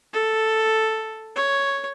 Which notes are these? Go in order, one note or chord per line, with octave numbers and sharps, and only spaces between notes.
A4
C#5